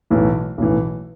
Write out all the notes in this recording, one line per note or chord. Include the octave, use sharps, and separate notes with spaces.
B1 A2 E3
B1 A2 E3